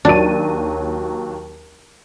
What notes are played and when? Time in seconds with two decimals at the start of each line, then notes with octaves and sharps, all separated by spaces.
0.05 D#2 F#3 D4 D#7